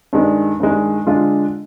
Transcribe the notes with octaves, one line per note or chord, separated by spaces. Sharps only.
G2 D#3 G#3
G2 D#3 G#3
D3 G#3 D4 F4